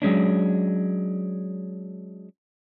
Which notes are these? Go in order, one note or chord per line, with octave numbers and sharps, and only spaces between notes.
F#3 G#3 C#4 D4